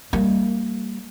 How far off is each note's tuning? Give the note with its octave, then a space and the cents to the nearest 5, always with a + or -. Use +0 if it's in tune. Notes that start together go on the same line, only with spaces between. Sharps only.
G3 +0 A#3 -20